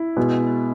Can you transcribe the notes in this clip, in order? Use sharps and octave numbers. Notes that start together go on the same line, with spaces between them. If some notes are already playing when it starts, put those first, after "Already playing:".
Already playing: E4
B2 G#3 B3